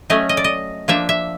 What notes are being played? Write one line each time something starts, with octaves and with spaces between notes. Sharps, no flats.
F#3 A3 C#4 D#5
D#5
D5
D#5
F3 A#3 D4 E5
E5